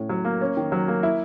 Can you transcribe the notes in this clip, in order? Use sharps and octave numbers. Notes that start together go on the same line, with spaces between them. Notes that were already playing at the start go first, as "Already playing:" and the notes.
Already playing: A2 C#4
F#3
A#3
C#4
D#3
F#3
A#3
E4